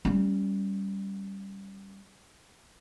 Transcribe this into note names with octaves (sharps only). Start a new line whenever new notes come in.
G3 C#4